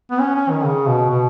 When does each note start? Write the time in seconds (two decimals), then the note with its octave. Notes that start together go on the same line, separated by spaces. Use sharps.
0.11 B3
0.20 C#4
0.35 C#4
0.50 D#3
0.65 C#3
0.88 B2
1.10 B2